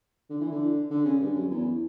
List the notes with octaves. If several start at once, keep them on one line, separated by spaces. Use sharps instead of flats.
D3
E3
D3
D3
C#3
G2
F#2
E2